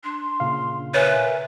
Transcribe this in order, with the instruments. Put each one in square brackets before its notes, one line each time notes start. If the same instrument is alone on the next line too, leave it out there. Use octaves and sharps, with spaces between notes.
[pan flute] D4 [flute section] C6
[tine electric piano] A#2 C#3 F5
[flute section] A#4 E5 G#5 [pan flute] B4 [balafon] C#5